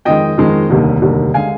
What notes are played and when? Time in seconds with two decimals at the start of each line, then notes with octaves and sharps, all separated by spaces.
0.05 F2 D#3 G#3 D#5 G5
0.38 F2 D#3 G#3
0.70 F1 D#2 D3 G3 A#3
1.02 F1 D#2 D3 G3 A#3
1.34 D3 G#3 F5 G#5